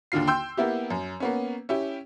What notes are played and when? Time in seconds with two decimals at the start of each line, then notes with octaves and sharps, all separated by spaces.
0.12 D#2 D3 D4 F4 C7
0.27 G5 C6 E6 G6
0.57 A#3 B3 E4 G4
0.90 F#2
1.20 A#3 B3 C#4
1.69 C#4 E4 G4